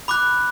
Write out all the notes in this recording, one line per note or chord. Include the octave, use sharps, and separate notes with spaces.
B5 D6 F#6